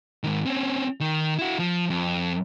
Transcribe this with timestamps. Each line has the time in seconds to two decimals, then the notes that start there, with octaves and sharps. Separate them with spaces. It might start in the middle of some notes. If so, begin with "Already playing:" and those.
0.24 G#2 D#3
0.46 C4 C#4
1.00 D#3
1.38 E4 F#4
1.59 F3
1.90 F2